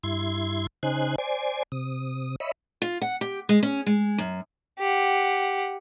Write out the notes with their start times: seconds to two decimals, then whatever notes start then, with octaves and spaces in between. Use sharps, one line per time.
0.03 G2 E4 C6 G#6
0.83 C#3 D#4 C5 G#5 F#6
1.18 C5 D5 G#5
1.72 C3 D#6
2.40 C#5 D#5 E5 B5
2.82 F4
3.02 F#5
3.21 G4
3.49 G#3
3.63 C#4
3.87 G#3
4.18 F#2
4.79 G4 F#5